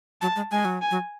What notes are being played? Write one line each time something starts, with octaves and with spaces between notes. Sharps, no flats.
F#3 A5
G#3
G#3 G#5
F#3
G#5
F#3